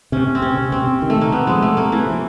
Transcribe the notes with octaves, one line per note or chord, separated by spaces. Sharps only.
C3 C#4
C3
C4
C3 C#4
C3
C3 C4
C3
D#3
A3
C3 A#3
C3 B3
F3 G#3
C3 A3
C3 A#3
E3 A3
F3